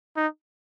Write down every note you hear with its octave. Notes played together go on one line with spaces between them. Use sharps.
D#4